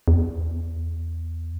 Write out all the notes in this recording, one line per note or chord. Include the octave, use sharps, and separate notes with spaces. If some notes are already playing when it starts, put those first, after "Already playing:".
E2